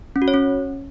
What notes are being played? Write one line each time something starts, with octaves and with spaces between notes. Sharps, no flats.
C#4
F#4
C#5
C#4